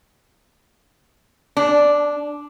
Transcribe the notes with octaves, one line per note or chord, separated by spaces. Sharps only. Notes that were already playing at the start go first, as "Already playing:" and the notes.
D4